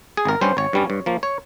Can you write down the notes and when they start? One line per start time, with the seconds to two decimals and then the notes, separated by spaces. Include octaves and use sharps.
0.17 G#4
0.25 G#1 A#4
0.41 G2 G3 C#4 C5
0.57 G#1 C#5
0.73 G2 G3 C#4
0.90 G2
1.06 F3 A#3
1.23 C#5